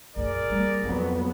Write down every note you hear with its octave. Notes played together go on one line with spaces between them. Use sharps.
A#1 F#2 G#4 A#4 D5
G3 A#3
F2 F#3 B3 D#4